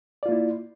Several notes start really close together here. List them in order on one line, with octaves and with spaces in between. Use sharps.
D5 F4 A#3 E4